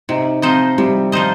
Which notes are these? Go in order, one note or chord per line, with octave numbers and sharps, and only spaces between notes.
C3 D#4
F3 C4 D#4 C5 D#5
C3 G3
F3 D#4 C5 D#5